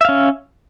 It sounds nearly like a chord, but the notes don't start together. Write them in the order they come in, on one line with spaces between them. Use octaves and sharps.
E5 F5 C#4